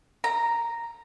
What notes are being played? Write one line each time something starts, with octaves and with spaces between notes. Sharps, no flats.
A#5